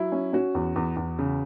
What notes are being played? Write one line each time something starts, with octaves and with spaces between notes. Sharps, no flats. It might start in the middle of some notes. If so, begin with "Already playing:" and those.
Already playing: F#3 E4
C#4
C#4 F#4
E2
E2
E2
C#3